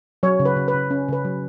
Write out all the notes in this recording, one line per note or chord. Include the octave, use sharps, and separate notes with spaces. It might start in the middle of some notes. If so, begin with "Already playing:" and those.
F#3 C#5
C#3
B4
C#3
B4
C#3
C#4
C#3 B4
F#3